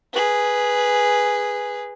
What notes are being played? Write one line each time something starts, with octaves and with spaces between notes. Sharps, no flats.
G#4 B4